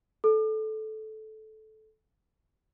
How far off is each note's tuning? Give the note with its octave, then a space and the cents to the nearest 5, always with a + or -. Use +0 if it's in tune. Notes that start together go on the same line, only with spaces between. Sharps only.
A4 -15